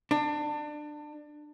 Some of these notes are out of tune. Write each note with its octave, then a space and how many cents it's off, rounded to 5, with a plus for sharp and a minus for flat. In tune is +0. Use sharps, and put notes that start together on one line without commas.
D4 +25